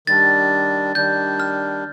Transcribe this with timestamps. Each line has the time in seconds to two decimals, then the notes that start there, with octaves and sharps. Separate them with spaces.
0.07 D#3 G3 D4 A6
0.95 D#3 G3 D4 G6
1.40 F6